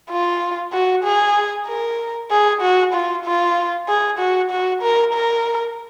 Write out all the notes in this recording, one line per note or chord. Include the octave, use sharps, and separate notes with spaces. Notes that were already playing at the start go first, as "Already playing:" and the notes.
F4
F#4
G#4
A#4
G#4
F#4
F4
F4
G#4
F#4
F#4
A#4
A#4